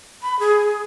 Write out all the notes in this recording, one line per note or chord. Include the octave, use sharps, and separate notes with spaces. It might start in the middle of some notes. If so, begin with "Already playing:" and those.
B5
G#4